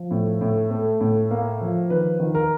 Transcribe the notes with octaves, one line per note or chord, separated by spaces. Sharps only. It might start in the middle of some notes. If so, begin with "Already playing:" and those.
Already playing: F3
A2
A2
A3
A2
A#3
F3
D#3 B4
D#3
A#4